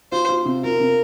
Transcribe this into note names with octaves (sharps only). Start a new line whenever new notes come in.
F4 C5
F4
C3
F4 A#4
C3